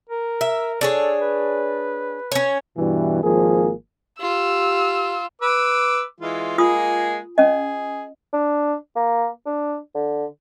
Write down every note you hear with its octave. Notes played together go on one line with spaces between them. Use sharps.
A#4
E5
D4 G#4 A4 C#5
B4
C#4 C#5
G2 B2 E3
G#1 F3 A#3 G#4
F4 G4 E6
B4 D6 E6
E3 G#3 F4
G#3 A#3 F4 G#4 D#6
C#4 G#4 D#5
D4
A#3
D4
D3